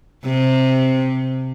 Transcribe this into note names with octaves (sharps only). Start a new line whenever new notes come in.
C3